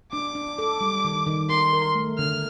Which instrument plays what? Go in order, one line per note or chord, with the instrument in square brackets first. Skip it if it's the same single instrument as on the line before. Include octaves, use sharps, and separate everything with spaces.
[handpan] D4 [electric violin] D6
[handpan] D4
A4
G3
D#3
D#3
[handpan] A#4 [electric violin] C6
[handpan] A#4
A3
[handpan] D3 [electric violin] F6